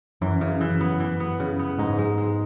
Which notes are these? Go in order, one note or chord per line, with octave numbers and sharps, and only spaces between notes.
F#2 E3
C#3
E3
B3
E3
B3
C#3
B3
G#2 D#4
G#3
G#3